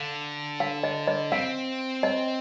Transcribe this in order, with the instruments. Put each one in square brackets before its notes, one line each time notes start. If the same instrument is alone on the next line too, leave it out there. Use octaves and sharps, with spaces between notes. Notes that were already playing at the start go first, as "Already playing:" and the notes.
Already playing: [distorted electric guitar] D3 [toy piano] F5
[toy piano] F5
D#5
D#5
[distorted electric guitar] C4 [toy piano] F5
[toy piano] D#5